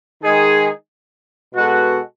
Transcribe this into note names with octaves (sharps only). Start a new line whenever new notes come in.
D#3 G#3 D#4 G#4
B2 G#3 B3 F#4 A4